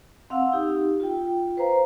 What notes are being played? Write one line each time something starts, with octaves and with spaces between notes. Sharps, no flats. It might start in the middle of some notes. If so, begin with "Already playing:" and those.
C4 F5 F#5 E6
D#4 G4
F4 G5
B4 C5 F5 A#5